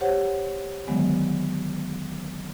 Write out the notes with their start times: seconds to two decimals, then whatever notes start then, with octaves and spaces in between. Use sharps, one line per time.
0.01 G4 C5 C#5 F#5
0.87 D3 D#3 F#3 G#3 B3